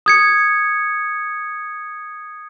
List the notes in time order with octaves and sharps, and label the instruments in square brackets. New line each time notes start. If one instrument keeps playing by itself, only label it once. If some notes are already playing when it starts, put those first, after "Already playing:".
[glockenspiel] D#6 G#6 C#7